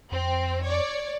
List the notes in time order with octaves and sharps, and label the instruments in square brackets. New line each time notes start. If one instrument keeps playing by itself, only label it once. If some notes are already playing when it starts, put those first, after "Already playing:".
[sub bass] F2 [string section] C4
[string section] C#5 D5